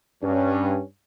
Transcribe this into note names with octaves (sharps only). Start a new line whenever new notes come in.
G2 C#4